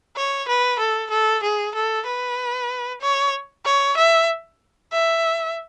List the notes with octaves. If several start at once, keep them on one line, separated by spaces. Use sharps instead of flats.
C#5
B4
A4
A4
G#4
A4
B4
C#5
C#5
E5
E5